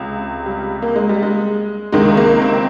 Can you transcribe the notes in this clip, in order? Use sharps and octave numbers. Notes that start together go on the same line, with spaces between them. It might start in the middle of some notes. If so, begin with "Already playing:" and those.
Already playing: C#2 C3
G3
A#3
G#3
G3
G#3
C#2 C3 D#3 G#3
A#3
C4